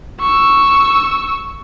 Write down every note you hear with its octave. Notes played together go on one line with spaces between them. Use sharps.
C#6 E6